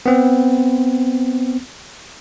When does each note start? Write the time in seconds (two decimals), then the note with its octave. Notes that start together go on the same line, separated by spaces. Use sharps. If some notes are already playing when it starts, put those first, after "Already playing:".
0.06 B3 C4